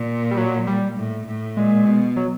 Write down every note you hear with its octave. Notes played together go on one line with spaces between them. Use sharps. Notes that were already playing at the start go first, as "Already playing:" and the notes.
Already playing: A#2
G3
F#3
G3
A2
A2
A#2 G#3
B2
F#3